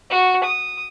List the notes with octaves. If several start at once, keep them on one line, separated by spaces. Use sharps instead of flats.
F#4
D#6